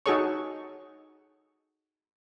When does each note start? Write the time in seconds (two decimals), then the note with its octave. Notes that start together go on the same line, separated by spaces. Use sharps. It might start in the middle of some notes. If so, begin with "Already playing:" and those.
0.06 D#4 F#4 G#4 A4 C#5 C#6